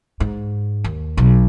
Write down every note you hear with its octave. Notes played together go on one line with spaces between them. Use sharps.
G#2
D#2
B1